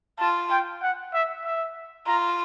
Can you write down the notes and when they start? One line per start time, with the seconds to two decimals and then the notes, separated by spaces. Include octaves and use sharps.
0.20 F4 A5
0.50 G5
0.83 F#5
1.14 E5
1.45 E5
2.07 F4 A#5